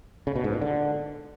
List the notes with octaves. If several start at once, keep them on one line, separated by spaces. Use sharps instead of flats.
C#3
B2
G#2
A#2
D3